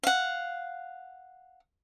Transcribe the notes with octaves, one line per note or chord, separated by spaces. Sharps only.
F5 F#5